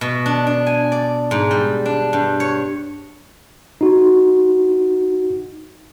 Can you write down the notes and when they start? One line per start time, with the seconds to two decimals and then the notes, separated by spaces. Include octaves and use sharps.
0.01 B2
0.26 D4
0.47 D4
0.67 G#5
0.92 D5
1.31 G#2
1.51 G3
1.86 D4
2.13 G2
2.40 C#5
3.81 D#4 F#4